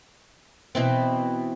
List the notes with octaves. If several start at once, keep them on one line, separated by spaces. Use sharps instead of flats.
B2 E3 C4